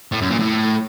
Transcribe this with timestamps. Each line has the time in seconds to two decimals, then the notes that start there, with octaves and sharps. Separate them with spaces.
0.12 A2
0.21 F#2
0.30 A#2
0.39 A2